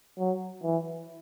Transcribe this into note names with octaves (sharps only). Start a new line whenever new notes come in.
F#3
E3